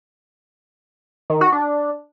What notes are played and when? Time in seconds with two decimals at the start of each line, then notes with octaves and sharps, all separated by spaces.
1.30 D#3
1.41 F#4
1.52 D4